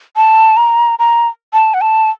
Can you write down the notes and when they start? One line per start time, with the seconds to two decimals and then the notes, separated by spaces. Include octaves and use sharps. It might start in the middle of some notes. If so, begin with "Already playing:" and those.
0.16 A5
0.57 A#5
0.99 A#5
1.53 A5
1.74 F#5
1.81 A5